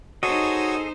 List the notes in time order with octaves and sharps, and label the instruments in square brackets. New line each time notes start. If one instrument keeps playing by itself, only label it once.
[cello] D#4 C5 [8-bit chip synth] F#4 C#5 [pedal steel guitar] G#4 A4 D#5